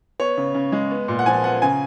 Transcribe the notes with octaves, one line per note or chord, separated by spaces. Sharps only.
B3 C#5
C#3
C#3
G#3
B3
A#2
F#5
F3 G#5
B3 F#5
C#3 G#5